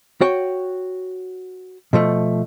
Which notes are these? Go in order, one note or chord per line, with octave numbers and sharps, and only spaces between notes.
F#4 C#5 G5
B2 F3 A3